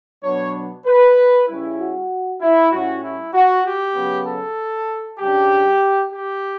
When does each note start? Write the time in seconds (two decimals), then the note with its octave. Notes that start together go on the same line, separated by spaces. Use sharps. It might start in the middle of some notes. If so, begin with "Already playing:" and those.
0.24 B2 F#3 B3 D4 C#5
0.86 B4
1.48 C#3 G3 C#4 E4
1.80 F#4
2.42 E4
2.72 A2 G3 C#4 E4 F#4
3.02 E4
3.34 F#4
3.65 G4
3.95 C#3 F#3 B3
4.26 A4
5.20 C#3 G3 D4 G4
6.13 G4